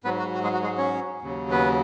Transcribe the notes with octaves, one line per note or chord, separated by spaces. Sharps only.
G#2 F#3 B3 B4
F#4
F#4
G#3 G#4
F#4
G#3 G#4
C#4 C#5
D#2 C#3 F#3
B3 B4